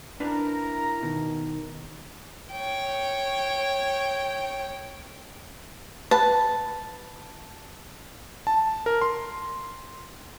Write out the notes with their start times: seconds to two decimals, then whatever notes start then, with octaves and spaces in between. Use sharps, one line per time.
0.20 D4 E4 A#4 B4 A#5
1.02 B2 D#3
2.51 C#5 G5
6.11 B4 A5
8.47 A5
8.86 A#4
9.01 C6